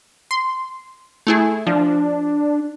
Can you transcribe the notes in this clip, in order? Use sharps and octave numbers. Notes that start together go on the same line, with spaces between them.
C6
A3 E4 G#4
F3 D4